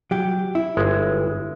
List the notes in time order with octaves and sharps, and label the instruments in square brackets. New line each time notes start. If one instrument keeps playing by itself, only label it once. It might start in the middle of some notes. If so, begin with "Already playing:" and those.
[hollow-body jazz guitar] F#3 G4
E4
[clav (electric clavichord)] G1 G#3